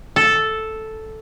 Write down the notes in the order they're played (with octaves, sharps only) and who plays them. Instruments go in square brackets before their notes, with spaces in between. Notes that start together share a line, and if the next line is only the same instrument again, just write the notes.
[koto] A4